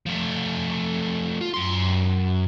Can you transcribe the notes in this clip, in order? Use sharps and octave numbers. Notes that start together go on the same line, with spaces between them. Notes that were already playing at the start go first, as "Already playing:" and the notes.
F3 A3
F4
F#2 C6